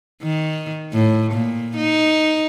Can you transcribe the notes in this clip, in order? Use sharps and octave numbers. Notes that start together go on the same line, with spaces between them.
D#3
A2
A#2
D#4